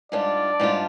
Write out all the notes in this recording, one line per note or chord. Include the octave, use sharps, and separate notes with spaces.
G#2 G3 D4 F4 D5
G#2 G3 D4 F4